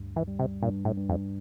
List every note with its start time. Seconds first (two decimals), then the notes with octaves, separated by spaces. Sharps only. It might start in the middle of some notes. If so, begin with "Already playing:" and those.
Already playing: D2 G2
0.16 E3
0.28 G3
0.39 C3
0.63 G2 A#2
0.85 A2
0.97 G2
1.09 F2